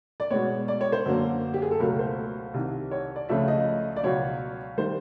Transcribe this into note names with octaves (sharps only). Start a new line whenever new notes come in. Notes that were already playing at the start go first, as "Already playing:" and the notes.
D5
B2 G#3 B3 C#5
D5
C#5
C5
F#2 D3 F#3 A#3
G4
G#4
A4
C#2 B2 F#3 A3 A#4
C5
C2 C3 D#3
C#5
D5
C#2 C#3 F3 A3 E5
D#5
D5
C#2 B2 F#3 C#5
D#3 G3 C5